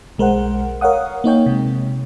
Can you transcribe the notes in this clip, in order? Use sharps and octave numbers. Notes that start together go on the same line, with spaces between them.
B1 G#3 A#4 C5 F#5
A#4 C#5 F5 F#5 D#6
A#3 D#4 C#5 G5
C3 G#3